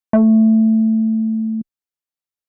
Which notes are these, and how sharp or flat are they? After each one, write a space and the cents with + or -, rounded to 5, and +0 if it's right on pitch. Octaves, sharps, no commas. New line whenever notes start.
A3 +10